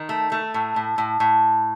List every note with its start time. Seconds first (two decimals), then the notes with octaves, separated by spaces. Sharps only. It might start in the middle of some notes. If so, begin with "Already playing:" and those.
Already playing: D#3
0.09 A3
0.32 A3
0.54 A2
0.76 A2
0.98 A2
1.20 A2